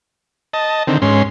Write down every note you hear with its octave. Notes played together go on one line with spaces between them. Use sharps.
D#5 A5
D3 D#3 C4
G#2 C#4 C6